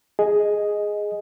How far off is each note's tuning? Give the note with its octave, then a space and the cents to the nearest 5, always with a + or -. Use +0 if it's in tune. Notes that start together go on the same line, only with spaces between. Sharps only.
G#4 +0 D#5 +0 G#5 +0